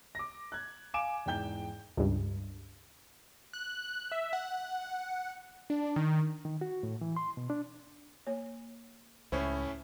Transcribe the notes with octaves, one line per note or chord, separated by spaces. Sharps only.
D6 A#6
F#6 G#6
F5 G#5 D6 D7 E7
E2 G#2 G5 G6 G7
C#2 G2
F#6
E5
F#5
D4
D#3
D#3
F#4
A2
E3
C6
B2
D4
A#3 C#5
C#2 A2 C#4 E4 C5